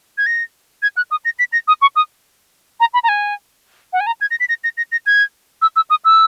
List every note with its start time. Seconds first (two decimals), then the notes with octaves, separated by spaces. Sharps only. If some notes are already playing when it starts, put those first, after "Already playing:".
0.18 G#6
0.26 A#6
0.82 G#6
0.97 F#6
1.11 D#6
1.25 A#6
1.39 B6
1.52 A#6
1.68 D#6
1.82 C#6
1.96 D#6
2.80 A#5
2.94 B5
3.03 A#5
3.08 G#5
3.93 F#5
4.00 G#5
4.06 A#5
4.21 G#6
4.31 A#6
4.40 B6
4.49 A#6
4.64 A#6
4.77 A#6
4.92 A#6
5.06 G#6
5.62 E6
5.76 E6
5.90 D#6
6.05 E6